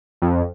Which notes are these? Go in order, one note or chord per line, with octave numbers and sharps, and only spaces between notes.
F2